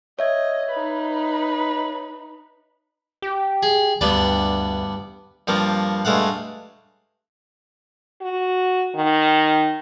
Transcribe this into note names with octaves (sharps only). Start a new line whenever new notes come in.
C#5 D#5 E5 G#6
D#4 B4
G4
G#4
D2 G2 B3 D5
G2 F3 G3 A#3
G2 G#3 A3 F5 F#5
F#4
D#3